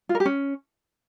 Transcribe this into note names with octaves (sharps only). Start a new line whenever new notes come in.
F4
A#4
G4
C#4